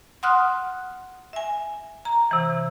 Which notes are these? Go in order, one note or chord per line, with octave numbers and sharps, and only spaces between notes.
F#5 C6 D#6 F6 F#6
E5 G#5
A#5
C3 E3